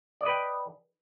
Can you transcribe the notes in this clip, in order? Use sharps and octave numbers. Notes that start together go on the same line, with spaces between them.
B4 D5 D#5 G5